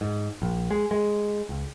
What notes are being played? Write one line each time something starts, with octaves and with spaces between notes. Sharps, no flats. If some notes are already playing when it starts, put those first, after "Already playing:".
G#2
A#1
G#3
G#3
C#2